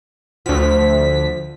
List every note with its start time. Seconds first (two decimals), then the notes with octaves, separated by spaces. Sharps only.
0.46 D2 F3 F#4 B6